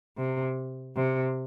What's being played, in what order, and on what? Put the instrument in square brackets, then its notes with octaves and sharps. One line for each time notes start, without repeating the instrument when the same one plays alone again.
[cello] C3
C3